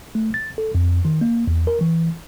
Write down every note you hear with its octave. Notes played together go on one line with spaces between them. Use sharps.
A3
A6
A4
F2
D#3
A#3
E2
A#4
E3